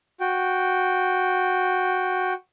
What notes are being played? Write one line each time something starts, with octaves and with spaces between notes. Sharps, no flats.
F#4 G5